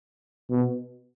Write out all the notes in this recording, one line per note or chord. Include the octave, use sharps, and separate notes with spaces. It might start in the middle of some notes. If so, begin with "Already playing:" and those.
B2